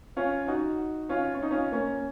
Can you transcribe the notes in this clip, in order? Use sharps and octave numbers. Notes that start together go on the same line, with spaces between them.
C#4 F4
D#4 F#4
C#4 F4
C#4
D#4
C#4 F4
A#3 C#4